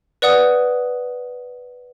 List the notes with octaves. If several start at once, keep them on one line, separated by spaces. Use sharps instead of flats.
B4 D5 F#5 D#6